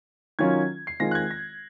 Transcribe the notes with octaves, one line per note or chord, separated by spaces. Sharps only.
D#3 F#3 C#4 F4 G#6
C7
D#3 G#3 C4 F4 A#6
F#6
G#6
A#6